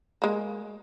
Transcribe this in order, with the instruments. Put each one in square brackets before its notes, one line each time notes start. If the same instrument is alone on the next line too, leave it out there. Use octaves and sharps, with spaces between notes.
[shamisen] G#3 A#3